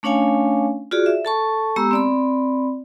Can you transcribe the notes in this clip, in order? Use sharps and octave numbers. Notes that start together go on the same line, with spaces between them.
A3 C#4 D4 C#5 F5 G#5
F4 F#4 G#4 D5
E5
A4 A5 C#6
G#3 B3 G4 A#5 E6
C4 D5 B5